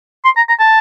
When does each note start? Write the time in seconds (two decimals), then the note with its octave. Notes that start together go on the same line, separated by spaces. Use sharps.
0.25 C6
0.37 A#5
0.49 A#5
0.59 A5